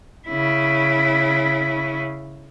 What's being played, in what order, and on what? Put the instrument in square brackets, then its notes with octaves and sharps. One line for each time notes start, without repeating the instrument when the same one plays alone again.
[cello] C#3 E4